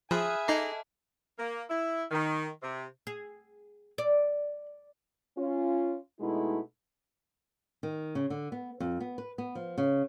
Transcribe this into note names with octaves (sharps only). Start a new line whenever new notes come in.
F3 G#4 E5 G#5 B5 F6 F#6
D#4 A4 D#5 A5 A#5 C7
A#3
E4
D#3
C3
G#4
D5
C#4 F4
B2 G#3 A3 D#4 E4
D#3
C#3
D3
B3
F2
B3
B4
B3
F3
C#3